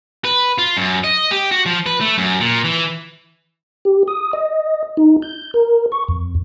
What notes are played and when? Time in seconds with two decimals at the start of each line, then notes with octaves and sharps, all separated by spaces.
0.25 B4
0.58 F4
0.77 F#2
1.04 D#5
1.31 G4
1.52 F#4
1.66 F3
1.86 B4
2.01 A3
2.18 F#2
2.40 A#2
2.64 E3
3.85 G4
4.08 D#6
4.33 D#5
4.97 D#4
5.22 G6
5.54 A#4
5.92 C#6
6.08 F2